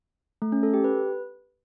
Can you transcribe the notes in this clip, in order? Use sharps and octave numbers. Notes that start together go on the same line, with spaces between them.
A3
C#4
A4
G4
B4